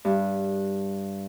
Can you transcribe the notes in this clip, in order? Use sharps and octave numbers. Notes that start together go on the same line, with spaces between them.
G2